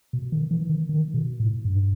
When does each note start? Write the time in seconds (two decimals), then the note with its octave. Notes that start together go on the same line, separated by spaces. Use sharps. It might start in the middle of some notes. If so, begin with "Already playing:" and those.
0.13 B2
0.32 D#3
0.51 E3
0.69 D#3
0.89 D#3
1.14 B2
1.40 A2
1.65 G2